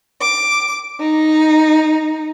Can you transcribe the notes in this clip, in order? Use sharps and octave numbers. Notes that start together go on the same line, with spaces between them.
D6
D#4